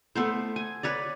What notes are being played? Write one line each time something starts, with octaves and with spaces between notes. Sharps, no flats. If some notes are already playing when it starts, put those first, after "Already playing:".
A3 B3 C5
G#5
B4 C#5 D5